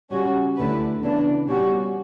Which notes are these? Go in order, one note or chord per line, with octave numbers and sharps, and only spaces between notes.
C#3 G3 C#4 F#4
D2 D3 A3 E4 B4
C#3 E3 B3 D4
B2 G3 C#4 F#4